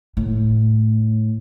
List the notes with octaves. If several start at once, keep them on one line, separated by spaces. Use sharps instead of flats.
A2